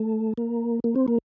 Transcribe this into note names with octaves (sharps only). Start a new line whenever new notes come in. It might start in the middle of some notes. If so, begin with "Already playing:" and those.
Already playing: A3
A#3
A#3
C4
A#3